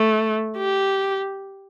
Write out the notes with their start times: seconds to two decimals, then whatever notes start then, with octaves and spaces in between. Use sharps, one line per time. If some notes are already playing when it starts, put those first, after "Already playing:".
Already playing: A3
0.57 G4